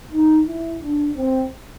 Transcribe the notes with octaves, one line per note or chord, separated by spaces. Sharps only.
D#4
E4
D4
C4